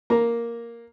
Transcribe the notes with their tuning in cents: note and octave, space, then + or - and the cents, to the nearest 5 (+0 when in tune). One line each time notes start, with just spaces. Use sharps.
A#3 +0 A#5 +0